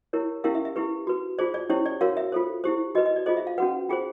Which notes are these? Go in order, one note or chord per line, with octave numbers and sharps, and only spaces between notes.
E4 G4 A#4 C#5
C#4 E4 G4 A#4 F5
E5
E5
E4 G4 B4
F#4 B4
F4 G#4 C5 D5
D5
C#4 E4 G4 C5 C#5
D5
F#4 A#4 C#5 F5
E5
F4 A4 C5
E4 G4 C5
F#4 B4 D#5
D#5
D5
F4 G#4 C5 D#5
E5
F5
C#4 F#4 B4 F#5
F4 G#4 C5 G5